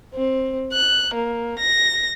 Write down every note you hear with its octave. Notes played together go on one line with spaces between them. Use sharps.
C4
F#6
A#3
A#6